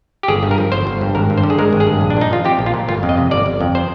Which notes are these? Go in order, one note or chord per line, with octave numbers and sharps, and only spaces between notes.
G4
G1 G#4
G2
A#4
F3
G1 C5
G1
G2
G#1 A#4
G2
C5
D3
G#4
G#3 A#4
G#1
G#4
G2
A#1
D4
A#2 D#4
F3 F4
C4 G4
A#1
F4
A#2
G1 F4
F2
D#5
C3
G1 D5
G1
F2
C5